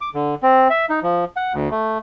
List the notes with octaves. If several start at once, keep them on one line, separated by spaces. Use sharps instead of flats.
D6
D3
C4
E5
D#4
F3
F#5
D2
A3